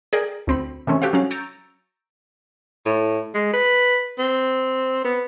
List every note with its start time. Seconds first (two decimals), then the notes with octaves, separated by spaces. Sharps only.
0.13 G#4 A#4 D5 G5
0.47 D2 C4 B5
0.87 C3 D#3 E3 A3 C4 C#4
1.02 F#4 G4 A4 C5 F5
1.13 F#3 C#4 F#4 F5
1.31 A#5 C#6 E6 G6 A6 D7
2.86 A2
3.35 G#3
3.53 B4
4.18 C4
5.04 B3